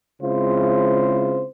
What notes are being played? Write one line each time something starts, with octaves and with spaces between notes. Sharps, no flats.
C#3 G#3 C4 E4 F4 C5